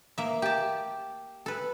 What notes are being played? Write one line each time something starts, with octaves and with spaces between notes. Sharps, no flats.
A#3 E5
G4 A5
A4 B4